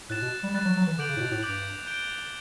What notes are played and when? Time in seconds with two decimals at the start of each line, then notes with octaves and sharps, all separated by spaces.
0.10 A2 F#6 A6 E7
0.22 B2
0.43 G3
0.54 G3 F#6 A6 E7
0.65 F#3
0.77 F#3
0.87 E3
0.98 D3 D6 G6 D7 F#7
1.09 C#3
1.17 A2
1.20 B2
1.31 A2
1.43 G2 D6 G6 D7 F#7
1.87 G6 D7 G7